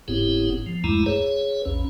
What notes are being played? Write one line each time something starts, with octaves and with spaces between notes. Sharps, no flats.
F#1 G#2 B3 C4 E4 G4
F3
E2 G2 G#3 A3 E4 A#5
G#4 B4 C#5
A#1 E2 C#4